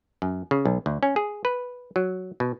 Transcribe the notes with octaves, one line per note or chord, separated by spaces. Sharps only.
F#2
C#3
B1
D2
C#4
G#4
B4
F#3
B2